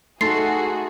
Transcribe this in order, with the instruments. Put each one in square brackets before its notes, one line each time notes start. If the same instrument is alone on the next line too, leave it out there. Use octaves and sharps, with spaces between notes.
[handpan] A3 D#4 [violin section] F#4 G#4 [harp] A4 C6 [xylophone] C7